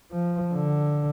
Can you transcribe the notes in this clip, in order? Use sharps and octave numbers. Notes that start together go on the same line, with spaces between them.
F3
D3